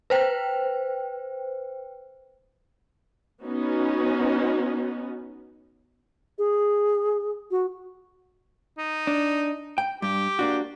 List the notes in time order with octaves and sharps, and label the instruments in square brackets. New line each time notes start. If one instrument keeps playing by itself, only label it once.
[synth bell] B4 C5 G5
[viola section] B3 C#4 D#4 F#4
[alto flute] G#4
F#4
[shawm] D#4
[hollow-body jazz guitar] D4
G5
[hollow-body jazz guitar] G2 [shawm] G4
[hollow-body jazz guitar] A#3 D4 F#4